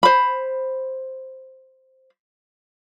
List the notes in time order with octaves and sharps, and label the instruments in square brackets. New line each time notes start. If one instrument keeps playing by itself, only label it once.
[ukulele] C5 B5